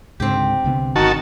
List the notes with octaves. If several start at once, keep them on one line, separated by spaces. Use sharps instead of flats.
C#2 G#2 D3 C4 G4
C2 D3 B3
G1 D#3 F#4 A5